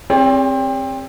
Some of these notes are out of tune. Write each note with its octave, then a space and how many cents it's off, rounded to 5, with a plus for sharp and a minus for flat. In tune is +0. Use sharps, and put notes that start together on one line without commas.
C4 +20 G#4 -45 C#5 +45